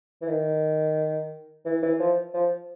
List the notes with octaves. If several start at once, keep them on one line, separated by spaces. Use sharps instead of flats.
E3
D#3
E3
E3
F3
F3